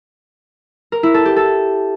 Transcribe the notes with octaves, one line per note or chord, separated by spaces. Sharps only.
A#4
E4
A4
G4
A4